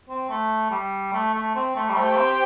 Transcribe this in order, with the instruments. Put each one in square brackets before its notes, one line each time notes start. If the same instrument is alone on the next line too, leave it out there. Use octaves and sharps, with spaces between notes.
[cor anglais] C4
A3
G3
A3
A3
C4
A3
G3
[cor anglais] A3 [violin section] G4 C5 G5
[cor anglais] A3
C4